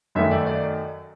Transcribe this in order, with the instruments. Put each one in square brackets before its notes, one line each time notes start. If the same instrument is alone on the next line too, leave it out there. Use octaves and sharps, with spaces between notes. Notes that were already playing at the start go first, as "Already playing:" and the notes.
[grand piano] F#2 D#3 F#3 A3 E5
D5
D5